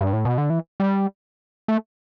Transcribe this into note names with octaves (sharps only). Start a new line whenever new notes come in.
G2
A2
B2
D3
E3
G3
A3